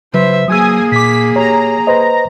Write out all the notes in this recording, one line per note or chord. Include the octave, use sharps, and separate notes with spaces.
C#3 F#3 B4 C5 E5
F#3 A#3 G#4 G#5 D#6 E6
A#2 D6 B6
G4 C#5 A#5
B4 C5 D#5